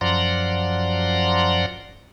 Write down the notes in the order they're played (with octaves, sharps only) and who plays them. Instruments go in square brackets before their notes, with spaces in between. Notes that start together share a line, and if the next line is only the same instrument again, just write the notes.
[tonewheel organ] F#2 F3 D5 F#5 A#5 C6